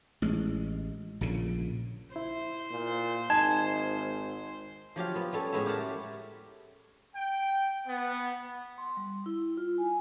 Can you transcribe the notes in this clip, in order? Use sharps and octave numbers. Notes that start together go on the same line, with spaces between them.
A1 G#3
A#1 A#2 C#3
E4 C5
A#2
G#1 D#4 D#5 G#5 A5 G#6
F3 F#3 G4 F5
B3 F4
G3 C#4 A4
A2 G#3 B3 C#5 E5
G4 A#4 F#5 A5
G5
B3
C6
G3
E4
F4
G#5